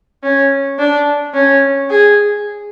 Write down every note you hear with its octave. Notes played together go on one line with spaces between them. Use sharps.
C#4
D4
C#4
G#4